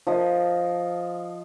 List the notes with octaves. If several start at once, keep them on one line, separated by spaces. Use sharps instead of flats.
F3 D#5